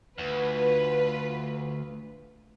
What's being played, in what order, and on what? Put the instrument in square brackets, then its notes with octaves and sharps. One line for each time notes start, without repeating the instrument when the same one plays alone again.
[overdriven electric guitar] D2 [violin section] F4 B4